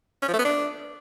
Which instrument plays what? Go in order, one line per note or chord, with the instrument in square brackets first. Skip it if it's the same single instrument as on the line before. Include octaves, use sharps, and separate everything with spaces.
[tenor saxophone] C#4
F3
A3
B3
D4